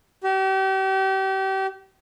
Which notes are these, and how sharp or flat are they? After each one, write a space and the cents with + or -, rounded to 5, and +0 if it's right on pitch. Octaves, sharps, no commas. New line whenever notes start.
G4 -35